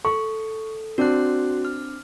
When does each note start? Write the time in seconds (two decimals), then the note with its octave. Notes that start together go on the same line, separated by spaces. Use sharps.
0.05 A4 C#6
0.98 C4 D4 F#4 F#6
1.65 F6